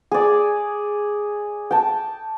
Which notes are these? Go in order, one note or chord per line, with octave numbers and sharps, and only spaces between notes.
G#4 D5
G5 A5